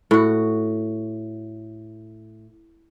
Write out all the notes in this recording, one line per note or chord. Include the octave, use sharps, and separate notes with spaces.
A2 F#4